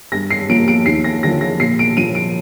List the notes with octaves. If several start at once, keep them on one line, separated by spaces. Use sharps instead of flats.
G2 A#6
C7
F3 A#3 D7
D7
D#2 C7
A#6
D3 F3 A#6
A#6
A#2 C7
D7
F3 A#3 D#7
D7